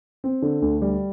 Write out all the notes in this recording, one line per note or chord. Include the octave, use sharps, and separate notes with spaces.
C4
D3
D2
G3